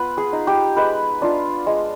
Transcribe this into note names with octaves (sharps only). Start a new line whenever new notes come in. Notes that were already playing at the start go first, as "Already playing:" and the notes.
Already playing: B3 F4 B4
G#4
D#4
G4
G#3 B4
D4 F4
G#3